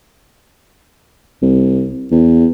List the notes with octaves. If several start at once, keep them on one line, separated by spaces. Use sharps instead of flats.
C2
E2